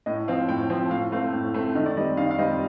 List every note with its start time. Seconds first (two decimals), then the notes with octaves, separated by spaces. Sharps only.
0.06 A2 D#5
0.28 F3 C4 F5
0.49 A2 G5
0.70 F3 C4
0.91 A2 F5
1.12 A3 C4 F5
1.33 A2
1.54 A3 C4
1.75 D#3 D#5
1.86 D5
1.97 G3 D#5
2.00 C4
2.17 D#3 F5
2.31 F5
2.38 G3 C4 D#5